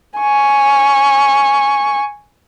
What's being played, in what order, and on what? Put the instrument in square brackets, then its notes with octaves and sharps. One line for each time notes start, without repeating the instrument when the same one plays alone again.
[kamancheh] G#5 C#6